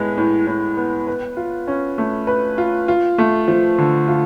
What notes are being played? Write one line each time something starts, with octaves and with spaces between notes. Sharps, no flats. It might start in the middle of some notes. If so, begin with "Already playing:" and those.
Already playing: A2 G#3 B3
A2
A2
B3
B4
F4
C#4
A3
B4
F4
F4
A3
F3
D3
F4